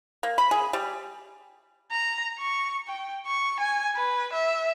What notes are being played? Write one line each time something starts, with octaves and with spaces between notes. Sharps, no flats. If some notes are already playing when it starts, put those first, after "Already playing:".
A#3
B5
G#4
G3
A#5
C#6
G5
C#6
G#5
B4
E5